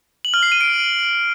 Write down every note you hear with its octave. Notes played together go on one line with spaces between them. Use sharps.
F#7
F6
C7
D#7
D7